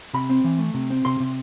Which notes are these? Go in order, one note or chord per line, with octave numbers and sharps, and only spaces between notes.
C3 B5
C4
E3
A3
C3
C4
C3 C6
C3